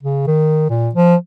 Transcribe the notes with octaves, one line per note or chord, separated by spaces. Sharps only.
C#3
D#3
A#2
F3